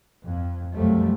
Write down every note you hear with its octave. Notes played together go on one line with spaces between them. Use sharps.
F2
C2 F#2 C3 F3 G3 A3